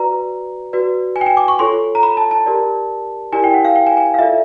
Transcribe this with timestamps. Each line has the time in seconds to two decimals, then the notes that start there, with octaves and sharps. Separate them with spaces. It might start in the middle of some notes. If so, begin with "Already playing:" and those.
Already playing: F#4 B4 D5 A#5
0.73 F#4 B4 D5
1.16 G#5
1.21 G5
1.26 G#5
1.37 D6
1.48 C#6
1.59 F4 A4 C#5 C6
1.95 A#5
2.03 B5
2.17 A5
2.31 A5
2.46 G4 A#4 D5
3.32 E4 G4 A#4 D5 G#5
3.44 G5
3.54 F#5
3.65 F5
3.76 G5
3.87 G#5
3.97 G#5
4.14 F5
4.19 F4 A4 D5 E5